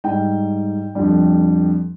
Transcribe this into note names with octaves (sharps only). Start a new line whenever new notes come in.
G#2 G3 G5
F2 D3 G3